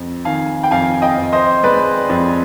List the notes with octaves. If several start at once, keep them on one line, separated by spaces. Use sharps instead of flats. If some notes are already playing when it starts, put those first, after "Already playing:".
Already playing: F2
D#3 F5 G#5
G5
F2 F5 G#5
D#5 G5
F2
C5 D#5
G#3 B4 D5
F2